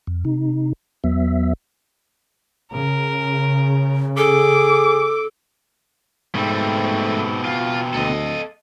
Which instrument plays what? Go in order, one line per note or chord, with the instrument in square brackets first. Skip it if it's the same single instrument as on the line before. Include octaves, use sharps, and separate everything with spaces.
[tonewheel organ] F2
C3 D#4
E2 F#3 B3 E5
[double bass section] C#3 [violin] A#4
[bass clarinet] G#4 [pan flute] A4 [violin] D6
[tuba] G#2 [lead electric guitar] B2 C4 [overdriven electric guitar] G3 A3
[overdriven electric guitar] F4
[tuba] D2 [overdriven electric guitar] A4 D#5